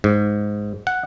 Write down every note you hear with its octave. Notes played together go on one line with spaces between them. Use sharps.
G#2
F#5